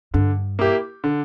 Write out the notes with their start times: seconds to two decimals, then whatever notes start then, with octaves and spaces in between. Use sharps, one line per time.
0.14 G2 D3
0.59 A#3 E4 G4
1.04 D3